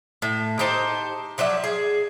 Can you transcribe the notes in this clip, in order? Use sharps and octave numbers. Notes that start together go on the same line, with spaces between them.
A2
D#4 G4 C5 A5
F3 F#3 D4 E5
G#4